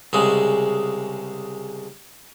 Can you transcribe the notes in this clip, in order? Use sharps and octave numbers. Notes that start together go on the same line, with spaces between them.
C2 C#3 G#3